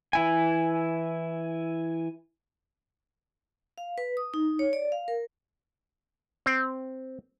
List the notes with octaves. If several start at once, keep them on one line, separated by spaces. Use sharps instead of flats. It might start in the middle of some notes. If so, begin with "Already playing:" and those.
E3 E4 G#5
F5
B4
D#6
D#4
C#5
D5
F5
A#4
C4